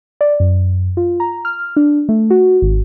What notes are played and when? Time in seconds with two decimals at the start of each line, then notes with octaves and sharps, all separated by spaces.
0.21 D5
0.40 F#2
0.97 F4
1.20 A#5
1.45 F6
1.77 D4
2.09 A3
2.30 F#4
2.62 G#1